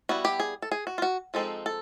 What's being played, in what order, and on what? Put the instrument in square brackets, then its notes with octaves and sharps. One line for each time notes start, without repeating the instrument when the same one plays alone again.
[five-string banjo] G3 B3 E4 F#4
G4
G#4
A4
G#4
F#4
F4
F#4
F3 G#3 C4 D#4 A4
A4